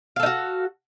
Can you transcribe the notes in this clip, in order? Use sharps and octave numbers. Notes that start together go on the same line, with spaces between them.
D#4 F#4 A4 F5